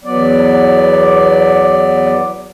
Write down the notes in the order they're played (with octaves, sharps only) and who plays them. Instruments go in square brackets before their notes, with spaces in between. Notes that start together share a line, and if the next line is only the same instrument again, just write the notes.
[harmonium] E2 F#3 B3 D5